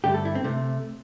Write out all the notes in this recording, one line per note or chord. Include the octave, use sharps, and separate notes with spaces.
G2 D3 A3 G4
A4
E4
C4
C3 A3